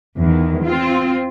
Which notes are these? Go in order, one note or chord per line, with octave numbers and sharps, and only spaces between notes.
E2 D#3
C4 F4